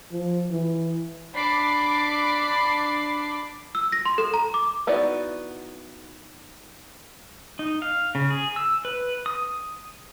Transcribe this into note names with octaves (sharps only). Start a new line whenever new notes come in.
F3
E3
D4 B5 D6 C7
E6
A#6
C6
A4
A#5
D6
B3 D#4 E4 F#4 D5
D#4
F5
C#3
G#4
E6
B4
D#6